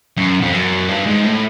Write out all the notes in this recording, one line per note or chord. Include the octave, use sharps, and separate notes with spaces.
F#2
F2
F#2
G2
G#2
A2